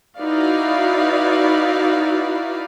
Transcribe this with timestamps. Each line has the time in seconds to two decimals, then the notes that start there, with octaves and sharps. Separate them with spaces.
0.18 D#4 E4 F#4 B4 D5 F5